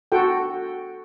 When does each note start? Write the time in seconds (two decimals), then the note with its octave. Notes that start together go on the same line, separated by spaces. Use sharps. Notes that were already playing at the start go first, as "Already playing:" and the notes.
0.12 F#4 A4 F#5 G5